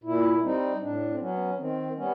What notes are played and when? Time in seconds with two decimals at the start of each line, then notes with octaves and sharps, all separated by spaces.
0.04 A#2 E4
0.42 G3 C4 D#4
0.81 A2 D4
1.10 C4
1.20 F#3 B3 C#4
1.58 D#3 C4
1.96 G3 B3 C#4